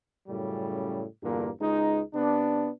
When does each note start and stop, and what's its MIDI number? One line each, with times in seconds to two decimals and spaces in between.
0.28 1.03 42
0.28 1.03 45
0.28 1.03 49
0.28 1.03 55
1.22 1.49 40
1.22 1.49 43
1.22 1.49 46
1.22 1.49 50
1.22 1.49 58
1.61 2.01 37
1.61 2.01 56
1.61 2.01 63
2.13 2.69 48
2.13 2.69 59
2.13 2.69 62